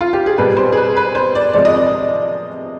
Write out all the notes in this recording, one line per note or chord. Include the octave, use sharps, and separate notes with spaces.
F4
G4
G#4
B2 G3 B4
C5
G#4
B4
B4
C5
D5
C3 F3 G#3 D5
D#5
D5